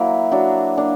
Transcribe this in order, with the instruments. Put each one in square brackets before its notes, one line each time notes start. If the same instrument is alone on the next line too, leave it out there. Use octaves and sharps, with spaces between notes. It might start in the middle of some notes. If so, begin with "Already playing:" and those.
Already playing: [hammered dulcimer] F#3 A#3 E4
F#3 D4
A#3 D4